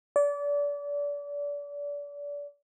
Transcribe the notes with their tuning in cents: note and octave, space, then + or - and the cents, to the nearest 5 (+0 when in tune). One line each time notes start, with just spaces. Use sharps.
D5 -30